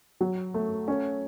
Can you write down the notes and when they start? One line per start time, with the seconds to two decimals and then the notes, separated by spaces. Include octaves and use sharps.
0.21 F#3
0.54 A3
0.88 C#4